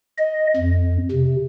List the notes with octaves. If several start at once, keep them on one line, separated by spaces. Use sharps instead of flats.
D#5
F2
C3